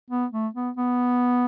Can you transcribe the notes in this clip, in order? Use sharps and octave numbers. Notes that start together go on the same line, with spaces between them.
B3
A3
B3
B3